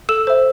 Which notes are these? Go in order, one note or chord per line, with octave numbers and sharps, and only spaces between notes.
A4 E6 E7
C5 E5